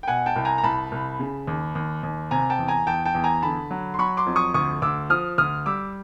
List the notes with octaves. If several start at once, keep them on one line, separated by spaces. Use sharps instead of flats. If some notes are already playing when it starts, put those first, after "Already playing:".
G5
B2 F#5 G#5
G5 A5
C2
G#5 A#5
A#5
C2 A5 B5
C2
C#3
D#2
D#2
D#2
C3 G#5 A#5
G5 A5
E2
G#5 A#5
E2 G5 A5
G5 A5
E2
G#5 A#5
D3 A5 B5
F#3
C6
F#3 B5 C#6
C6 D6
F2
C#6 D#6
D2 C#6 D#6
D2 D6 E6
F3 D#6 F6
D2 D#6 F6
G3 D6 E6